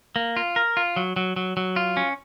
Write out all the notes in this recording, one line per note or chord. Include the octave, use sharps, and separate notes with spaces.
A#3
F4
A#4
F4
F#3
F#3
F#3
F#3
F4
C#4